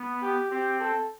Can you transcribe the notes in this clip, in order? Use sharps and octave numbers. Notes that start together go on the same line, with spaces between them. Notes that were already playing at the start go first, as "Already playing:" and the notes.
Already playing: B3
G4
C4 G4
A4